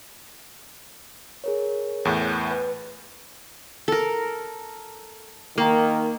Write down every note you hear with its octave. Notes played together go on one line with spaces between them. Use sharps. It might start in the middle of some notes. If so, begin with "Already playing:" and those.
G#4 A#4 C#5
E2 A2
B4
A4 A#4
D#3 A#3